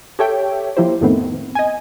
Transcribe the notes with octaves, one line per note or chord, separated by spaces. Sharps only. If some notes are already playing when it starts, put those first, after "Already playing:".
G4 A4 C#5 E5 G5
F3 A#3 E4 G4 C5
F2 A2 D#3 A3 B3 C4
D#5 G#5